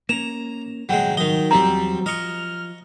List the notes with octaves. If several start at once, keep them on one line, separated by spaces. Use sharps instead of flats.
A#3 C#4 A#5 E7
D#1 G#1 C#3 F#3 G#3 G5
D#3 F#3 D#5 G7
E2 F3 G3 C4 A#5
F3 D#5 C#6 F6